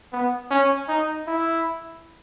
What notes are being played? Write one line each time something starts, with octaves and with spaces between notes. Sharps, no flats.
B3
C#4
D#4
E4